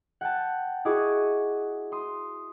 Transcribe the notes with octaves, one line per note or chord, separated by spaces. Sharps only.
F#5 G5 A5
E4 F#4 G#4 D#5 C#6 D6
C6 D#6